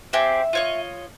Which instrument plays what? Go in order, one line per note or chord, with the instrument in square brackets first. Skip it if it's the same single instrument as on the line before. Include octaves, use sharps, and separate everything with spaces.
[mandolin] C4 G4 G#4 [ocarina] E5
[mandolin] F4 C#5 D#5